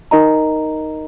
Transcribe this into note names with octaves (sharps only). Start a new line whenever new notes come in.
D#4 A#4 D#5 A#5